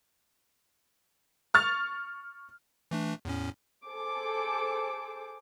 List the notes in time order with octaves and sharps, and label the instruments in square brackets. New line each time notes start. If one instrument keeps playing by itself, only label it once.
[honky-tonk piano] C#6 F6 A6 F7
[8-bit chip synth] E3 A3 D4
E2 A2 C#4
[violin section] G#4 A4 C5 D6